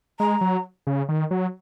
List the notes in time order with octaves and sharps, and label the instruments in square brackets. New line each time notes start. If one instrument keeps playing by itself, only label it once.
[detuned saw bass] G#3 [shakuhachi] A#5
[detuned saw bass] F#3
C#3
D#3
F#3